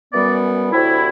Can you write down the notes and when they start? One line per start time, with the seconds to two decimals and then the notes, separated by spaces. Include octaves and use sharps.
0.12 F#2 E3 G3 B3 D5
0.71 D2 C3 F#3 C4 E4